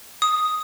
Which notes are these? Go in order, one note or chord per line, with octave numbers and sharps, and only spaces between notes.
D#6